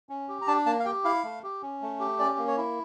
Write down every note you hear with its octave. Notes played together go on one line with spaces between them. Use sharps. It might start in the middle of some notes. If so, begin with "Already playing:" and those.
C#4
G4
A#5
D4 A5
A#3 A5
F5
G4 G5
E4 F5
A3
G4
C#4
A3
G4
C#4 D5
A#3
C#5
E4